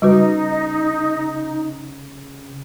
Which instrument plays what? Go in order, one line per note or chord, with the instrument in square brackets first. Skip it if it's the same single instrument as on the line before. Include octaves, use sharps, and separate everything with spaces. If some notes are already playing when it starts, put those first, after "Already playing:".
[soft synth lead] C#3 [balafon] G3 F#4 B4 [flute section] D#4